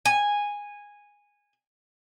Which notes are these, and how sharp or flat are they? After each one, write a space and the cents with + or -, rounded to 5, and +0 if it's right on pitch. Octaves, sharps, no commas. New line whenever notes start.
G#5 -10